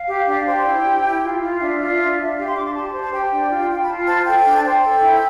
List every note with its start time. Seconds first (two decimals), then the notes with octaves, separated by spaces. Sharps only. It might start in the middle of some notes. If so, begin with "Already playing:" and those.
Already playing: F5
0.08 G4
0.27 D4
0.46 C5 G5
0.65 E4
0.84 G4
1.04 E4
1.22 F4
1.42 F4
1.60 D4 E5
1.79 F4
1.99 D4
2.18 D4
2.37 G4 F5
2.47 C6
2.55 D4 D6
2.65 C6
2.74 G4 A5
2.94 C5
3.02 A5
3.12 G4 G5
3.32 D4
3.51 F4
3.70 F4
3.81 B5
3.88 F4 A5
4.08 C5 A5
4.26 A4 G5
4.46 D4
4.57 A5
4.65 C5 G5
4.85 A4
5.02 E4